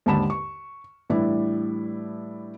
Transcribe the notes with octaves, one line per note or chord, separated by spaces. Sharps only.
D#2 G#2 D3 A5 B5 E7
C#6
A2 E3 G3 D4 E4